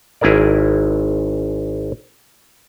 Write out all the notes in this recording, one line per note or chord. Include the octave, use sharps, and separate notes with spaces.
G#1 E4 G#4 A#4 D5